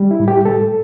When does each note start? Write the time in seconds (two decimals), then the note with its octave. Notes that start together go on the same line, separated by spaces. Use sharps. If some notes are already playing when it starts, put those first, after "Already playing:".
Already playing: G3
0.11 E4
0.20 A2
0.28 G4
0.45 A2 A4